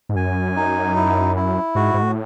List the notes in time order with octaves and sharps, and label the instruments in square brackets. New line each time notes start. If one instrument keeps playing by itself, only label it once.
[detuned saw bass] G#2
[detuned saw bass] F#2 [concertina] G#5
[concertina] D#4
E4
E4
[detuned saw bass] G#2 [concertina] F#4
[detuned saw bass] G#2
A2